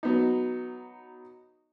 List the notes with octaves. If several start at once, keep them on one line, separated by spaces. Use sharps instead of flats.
F#3 B3 D#4